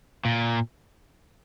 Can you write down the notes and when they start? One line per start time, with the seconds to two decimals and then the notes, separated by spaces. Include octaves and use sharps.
0.25 A#2